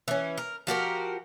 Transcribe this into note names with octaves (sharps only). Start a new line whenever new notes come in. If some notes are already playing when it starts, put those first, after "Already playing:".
E3 C#4
A#4
F3 F#4 G4 A#4